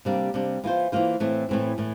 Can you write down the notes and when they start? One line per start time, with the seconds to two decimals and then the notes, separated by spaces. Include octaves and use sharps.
0.05 C3 G3 A#3 D4
0.34 C3 G3 A#3 D4
0.64 E3 A#3 F4 C5
0.92 E3 A#3 F4 C5
1.20 A2 E3 A3 C4
1.49 A2 E3 A3 C4
1.78 A2 E3